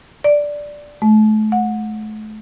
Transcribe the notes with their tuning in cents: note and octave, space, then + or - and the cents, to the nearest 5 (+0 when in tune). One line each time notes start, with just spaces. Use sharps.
D5 +0
A3 -35
F#5 -25